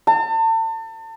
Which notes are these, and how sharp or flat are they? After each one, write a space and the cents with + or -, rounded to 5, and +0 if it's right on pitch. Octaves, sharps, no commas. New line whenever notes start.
A5 +35